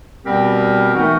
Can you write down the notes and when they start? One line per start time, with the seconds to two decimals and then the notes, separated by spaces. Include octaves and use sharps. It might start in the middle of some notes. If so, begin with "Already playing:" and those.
0.25 B2 G3 B3 C4 G4 A#4
0.94 E3 A3 B3 D#4 F#4 A#4